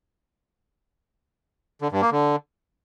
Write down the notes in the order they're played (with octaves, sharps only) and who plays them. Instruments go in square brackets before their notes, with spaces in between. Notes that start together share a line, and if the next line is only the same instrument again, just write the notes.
[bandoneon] D3
G2
A#3
D3